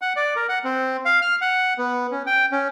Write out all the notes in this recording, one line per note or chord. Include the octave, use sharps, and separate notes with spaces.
F#5
D5
A#4
F#5
C4
F5
F6
F#5
B3
C#4
G5
C#4